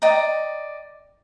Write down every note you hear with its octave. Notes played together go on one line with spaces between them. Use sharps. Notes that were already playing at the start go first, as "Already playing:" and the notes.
D5 D#5 G5 A#5